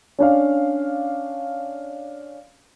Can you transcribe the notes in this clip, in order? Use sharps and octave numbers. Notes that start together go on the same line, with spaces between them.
C#4 D4 F5